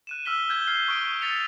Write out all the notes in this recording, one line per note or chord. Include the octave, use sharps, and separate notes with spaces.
F#6 D#7 E7
E6 F6 B6 G7
F6 G6 G#6 G7
F6 G#6 C7 E7 G7
C#6 D#6 F6 D7
A6 B6 C#7 F7